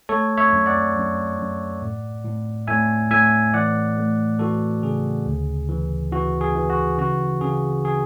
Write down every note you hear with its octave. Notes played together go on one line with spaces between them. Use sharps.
A3 A4 C#5
C#5 E5
F#2
D5 F#5
F#2
F#2
A2
A2
A2 E5 G#5
A2 E5 G#5
E3 D5 F#5
A3
E3 F#4 A4
C#3 G#4
D2
E3
E3 F#4
G#4
E3
F#4
C#3 F#4
C#3 G#4
G#4